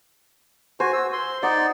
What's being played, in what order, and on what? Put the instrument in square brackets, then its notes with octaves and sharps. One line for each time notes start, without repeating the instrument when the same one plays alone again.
[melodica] F#4 G#5 [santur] C5
[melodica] E6
C6
[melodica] D#4 D5 [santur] F#5